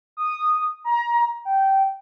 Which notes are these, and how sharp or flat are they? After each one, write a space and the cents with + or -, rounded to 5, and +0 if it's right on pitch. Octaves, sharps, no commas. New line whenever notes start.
D#6 -10
A#5 +25
G5 -15